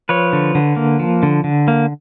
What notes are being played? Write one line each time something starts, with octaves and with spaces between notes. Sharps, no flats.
F3 B4 C#5
D3
D3
A#3
F3
D3
D3
A#3